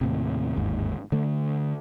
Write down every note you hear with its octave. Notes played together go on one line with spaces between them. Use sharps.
D#2 A2 C3
G1 D#2 G#2
D3 A3